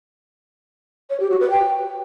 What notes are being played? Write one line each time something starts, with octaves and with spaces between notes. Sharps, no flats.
C#5
G4
F#4
B4
G5